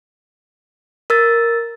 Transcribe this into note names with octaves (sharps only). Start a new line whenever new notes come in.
A#4 E6 A6